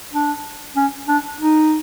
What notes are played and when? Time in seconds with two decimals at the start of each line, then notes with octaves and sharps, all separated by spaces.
0.13 D4
0.76 C#4
1.08 D4
1.40 D#4